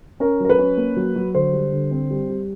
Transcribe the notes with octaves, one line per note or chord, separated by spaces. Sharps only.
C#4 A#4
F#3 A#4
B4
C#4
A#3
F#3
F#3
D3 C5
G3
D3
C4
G3
G3